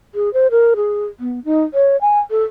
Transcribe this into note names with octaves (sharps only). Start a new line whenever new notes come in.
G#4
C5
A#4
G#4
B3
D#4
C#5
G#5
A4